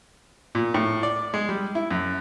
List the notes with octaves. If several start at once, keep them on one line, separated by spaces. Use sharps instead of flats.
A#2
A2
D5
G#3
G3
E4
F#2